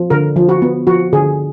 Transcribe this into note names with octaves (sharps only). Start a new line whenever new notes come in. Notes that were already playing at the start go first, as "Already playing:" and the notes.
Already playing: F3
D3 A#4
F3
F#4
B3
F3 F#4
D3 G#4